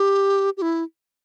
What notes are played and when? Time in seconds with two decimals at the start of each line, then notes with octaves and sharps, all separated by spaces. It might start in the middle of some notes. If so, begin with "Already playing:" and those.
Already playing: G4
0.57 G4
0.62 E4